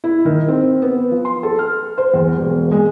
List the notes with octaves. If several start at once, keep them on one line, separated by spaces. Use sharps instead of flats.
E4
D#3
C4
B3
F3
C6
A4
F6
C5
E2
E1
G#3